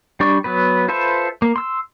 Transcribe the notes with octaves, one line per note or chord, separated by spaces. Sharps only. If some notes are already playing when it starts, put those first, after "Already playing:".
G3 D4 D5 C#6
F#3 B3 B4
F4 A4 B4 C5 E5
A#3
C6 E6